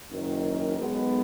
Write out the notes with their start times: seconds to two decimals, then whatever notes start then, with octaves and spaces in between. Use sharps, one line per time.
0.10 F#1 F#2 D#3
0.77 B1 B2 G#3 B3